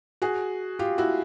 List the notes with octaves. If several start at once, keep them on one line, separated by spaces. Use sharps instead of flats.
F#4 G#4
F4 G4
E4 F#4